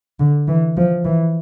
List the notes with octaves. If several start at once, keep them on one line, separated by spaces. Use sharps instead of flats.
D3
E3
F3
E3